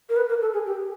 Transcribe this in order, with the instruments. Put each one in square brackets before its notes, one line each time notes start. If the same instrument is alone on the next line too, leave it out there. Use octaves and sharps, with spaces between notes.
[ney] A#4
B4
A#4
A4
G#4
G4